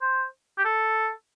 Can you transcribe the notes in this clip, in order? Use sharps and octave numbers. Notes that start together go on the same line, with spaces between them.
C5
G4
A4